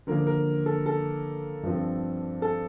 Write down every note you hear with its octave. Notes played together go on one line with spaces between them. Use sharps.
D3 F3 A#3 A#4
A#4
A4
A4
G2 F3 C4
A4